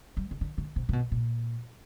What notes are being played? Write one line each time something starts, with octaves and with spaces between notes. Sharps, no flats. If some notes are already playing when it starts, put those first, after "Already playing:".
G3
C#3
D3
D3
C3
C3
B2
A#2